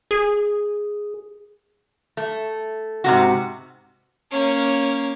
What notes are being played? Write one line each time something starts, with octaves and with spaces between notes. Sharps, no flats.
G#4
A3
G#2 C3 F#4
A#3 C#4